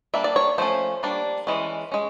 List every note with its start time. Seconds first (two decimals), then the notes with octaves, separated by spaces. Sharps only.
0.14 G3 A#3 D4 E5
0.24 D5
0.36 C#5
0.58 F3 A3 C#4 C5
1.03 G3 A#3 D4
1.47 E3 G#3 C#4
1.92 G#3 C#4